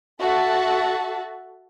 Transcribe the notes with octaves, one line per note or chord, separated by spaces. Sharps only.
F#4 A4 E5 A5